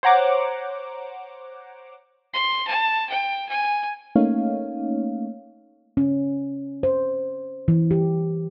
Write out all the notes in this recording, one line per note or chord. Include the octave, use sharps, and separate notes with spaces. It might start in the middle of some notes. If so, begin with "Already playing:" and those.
C5 C#5 F#5 A#5 D6
C6
A5
G5
G#5
A3 A#3 C#4 D#4 C#5 F5
C#4
C5
E3
G4